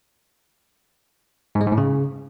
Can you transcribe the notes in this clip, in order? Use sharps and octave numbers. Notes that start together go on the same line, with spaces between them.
G#2
G#3
G#2
A2
C#3